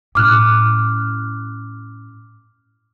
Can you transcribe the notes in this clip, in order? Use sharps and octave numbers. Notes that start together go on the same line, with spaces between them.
A2 C#4 D6 F6 F#6